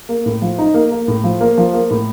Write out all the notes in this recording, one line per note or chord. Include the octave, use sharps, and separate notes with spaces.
A#3
A2
F3
D#4
A#3
A#3
A2
F3
A#3
F3
A#3
A2